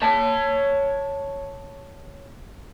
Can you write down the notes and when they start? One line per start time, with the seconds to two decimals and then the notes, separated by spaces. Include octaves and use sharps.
0.02 C#5 A5